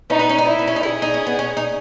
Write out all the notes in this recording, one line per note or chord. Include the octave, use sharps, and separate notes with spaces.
C#4 D#4
B3
C#4
D#4
E4
B3
C#4
D#4
E4 G#4
D#4
C#4
B3
C#4
D#4